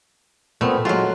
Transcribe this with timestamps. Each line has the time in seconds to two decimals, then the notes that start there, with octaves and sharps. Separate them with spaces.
0.61 A#2 A3 B3 C4
0.85 F#3 G#3 F4 F#4